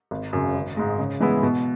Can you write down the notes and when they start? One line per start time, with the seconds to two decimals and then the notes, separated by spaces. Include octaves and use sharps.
0.11 G#1
0.33 F#2 C#3
0.54 G#1
0.77 G#2 G#3
0.99 C#3
1.20 E3 G#3 B3 E4
1.43 B2